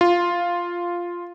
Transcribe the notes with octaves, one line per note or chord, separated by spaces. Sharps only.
F4